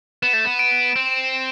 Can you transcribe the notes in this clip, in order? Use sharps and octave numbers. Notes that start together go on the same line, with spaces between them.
B3 E7
A3
B3
D7
C4